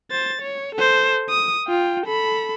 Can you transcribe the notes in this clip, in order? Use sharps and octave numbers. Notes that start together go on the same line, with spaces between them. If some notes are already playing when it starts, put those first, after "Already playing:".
C5 A6
C#5
A4 C5
D#6
F4 G5
A4 B5